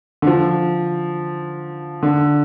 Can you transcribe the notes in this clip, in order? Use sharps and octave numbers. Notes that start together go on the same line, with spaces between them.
D3
F3
D3